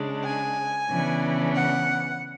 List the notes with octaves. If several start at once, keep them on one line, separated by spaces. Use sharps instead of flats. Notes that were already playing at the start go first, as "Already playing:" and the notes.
Already playing: C#3 G#3 D4
G#5
C#3 E3 B3 D4
F#5